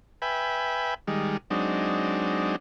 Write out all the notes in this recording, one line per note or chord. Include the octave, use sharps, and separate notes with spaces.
B4 E5 G5 G#5 B5
D#3 G3 G#3
F#3 G#3 C4 D4 D#4